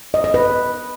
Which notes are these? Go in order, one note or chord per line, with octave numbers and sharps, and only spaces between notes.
D#5
D#5
B4